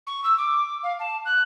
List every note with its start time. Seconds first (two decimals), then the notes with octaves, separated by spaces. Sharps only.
0.07 C#6
0.24 E6
0.38 D6
0.83 F5
1.00 A5
1.25 F#6